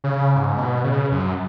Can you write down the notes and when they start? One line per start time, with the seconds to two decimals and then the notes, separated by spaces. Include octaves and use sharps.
0.04 C#3
0.36 G#2
0.58 B2
0.84 C#3
1.12 F#2